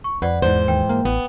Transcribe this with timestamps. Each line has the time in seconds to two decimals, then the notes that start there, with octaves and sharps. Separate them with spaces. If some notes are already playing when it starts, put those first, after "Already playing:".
0.04 C#6
0.22 F2 B4 D5 F#5
0.42 E2 G#2 E3 C5
0.68 D#2 G5
0.89 A#3
1.05 A1 B3